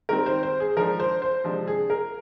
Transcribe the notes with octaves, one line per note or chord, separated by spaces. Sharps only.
D#3 G3 C4 A#4
C5
C5
G#4
F3 G#3 D4 A#4
C5
C5
C3 F3 G#3 D4
G#4
A#4